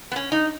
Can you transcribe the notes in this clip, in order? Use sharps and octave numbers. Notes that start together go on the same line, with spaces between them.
B3
C#4
D#4